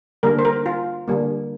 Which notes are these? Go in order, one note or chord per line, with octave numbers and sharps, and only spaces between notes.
D3 G3 A#3 A#4
C5
A#4
F4
D3 G3 A#3